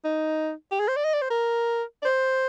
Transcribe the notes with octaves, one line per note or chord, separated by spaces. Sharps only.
D#4
G4
G#4
C5
D5
D#5
D5
C5
A#4
D5
C5